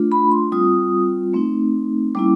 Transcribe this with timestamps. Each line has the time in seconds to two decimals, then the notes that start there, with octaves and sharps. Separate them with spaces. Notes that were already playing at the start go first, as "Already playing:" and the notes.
Already playing: A3 D4 F4
0.12 B5
0.31 C6
0.52 G3 C4 F4 D#6
1.34 A3 C4 D#4
2.15 G3 A#3 C#4 E4 D6